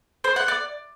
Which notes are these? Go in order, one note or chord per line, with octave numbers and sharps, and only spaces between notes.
C5
F#5
D5